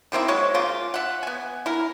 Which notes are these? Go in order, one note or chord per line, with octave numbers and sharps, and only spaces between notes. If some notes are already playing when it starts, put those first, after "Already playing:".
D#3 A#3 C4 E4
F#3 G#3 C#5
C#3 A#3 F4
E5 F#5
B3 G#5
E4 A#4